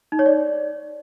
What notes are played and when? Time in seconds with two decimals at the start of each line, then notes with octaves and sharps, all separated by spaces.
0.12 D#4
0.19 C#5
0.26 D5